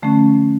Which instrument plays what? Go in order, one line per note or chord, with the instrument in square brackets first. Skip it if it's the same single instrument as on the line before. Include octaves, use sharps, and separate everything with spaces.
[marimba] D3 F3 A3 C#4